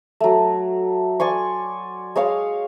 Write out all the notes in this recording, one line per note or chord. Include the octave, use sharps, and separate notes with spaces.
F#3 A3
D5 G#5 C6 C#6
G#3 C#5 F5